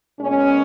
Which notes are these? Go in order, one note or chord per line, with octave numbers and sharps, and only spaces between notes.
A#2 G#3 B3 C#4